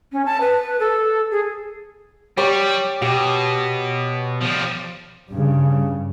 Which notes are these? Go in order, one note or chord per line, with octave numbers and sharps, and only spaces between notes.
C#4
A5
B4
A4
G#4
G3 G4 C#5 D6
B2 G4
F3 G3
G2 C#3